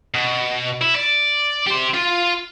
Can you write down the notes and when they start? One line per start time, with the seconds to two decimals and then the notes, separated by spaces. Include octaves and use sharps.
0.14 B2
0.81 E4
0.95 D5
1.67 G4 C5
1.94 F4